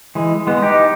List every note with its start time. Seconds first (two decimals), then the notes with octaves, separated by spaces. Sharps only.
0.15 E3 G#3
0.47 G#3 B3
0.62 D#4 G4